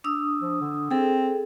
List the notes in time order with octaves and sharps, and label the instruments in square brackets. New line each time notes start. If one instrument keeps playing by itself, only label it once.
[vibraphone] D4 D#6 E6
[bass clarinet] F3
D3
[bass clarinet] C4 [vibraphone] G#4 A4